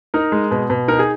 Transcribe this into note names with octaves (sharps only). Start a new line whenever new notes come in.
D#4 A#4
G#3
B2
B2
D#4 A#4
G#4